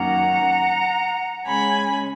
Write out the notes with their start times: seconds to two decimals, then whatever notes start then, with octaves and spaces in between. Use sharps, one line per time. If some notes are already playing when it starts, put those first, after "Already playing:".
Already playing: F#2 D#3 A#3 C#4 F#5 A#5
1.46 C#3 G#3 C#4 G#5 B5